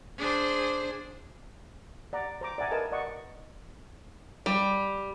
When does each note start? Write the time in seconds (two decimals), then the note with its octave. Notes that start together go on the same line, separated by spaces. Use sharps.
0.18 D4 G#4 C5
2.13 D5 F#5 A#5
2.41 C5 A#5 D6
2.58 D5 E5 F#5 G#5 A#5
2.71 A#4 B4 D#5 G#5 A5
2.92 D5 D#5 F#5 C#6
4.46 G3